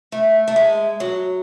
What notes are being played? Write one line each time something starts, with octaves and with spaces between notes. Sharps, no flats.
A3
A3
G#3
F#3